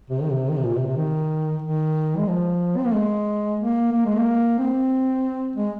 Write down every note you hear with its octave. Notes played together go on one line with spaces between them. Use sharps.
C3
D#3
C3
D#3
C3
A#2
C3
C3
D#3
D#3
G#3
F3
C4
A#3
G#3
A#3
A#3
G#3
A#3
C4
G#3